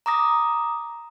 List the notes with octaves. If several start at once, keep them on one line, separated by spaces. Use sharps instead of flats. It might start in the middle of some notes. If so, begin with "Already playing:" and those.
A#5 D6 D#6 A#6